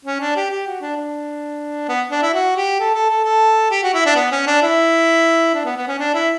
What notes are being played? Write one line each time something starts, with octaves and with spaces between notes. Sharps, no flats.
C#4
D4
G4
G4
F#4
D4
D4
B3
D4
E4
F#4
G4
A4
A4
A4
A4
G4
F#4
E4
D4
B3
C#4
D4
E4
D4
B3
B3
C#4
D4
E4